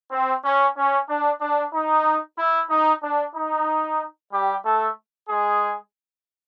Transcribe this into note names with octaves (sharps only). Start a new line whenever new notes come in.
C4
C#4
C#4
D4
D4
D#4
E4
D#4
D4
D#4
G3 G4
A3 A4
G#3 G#4